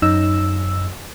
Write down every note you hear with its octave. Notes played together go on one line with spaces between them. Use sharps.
F#2 D#4 E6